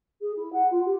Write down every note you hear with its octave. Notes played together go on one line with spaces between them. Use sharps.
G#4
E4
F#5
F4
G4